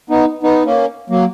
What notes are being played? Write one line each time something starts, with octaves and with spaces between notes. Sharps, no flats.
B3 D#4
B3 D#4
A#3 C#4
F#3 A#3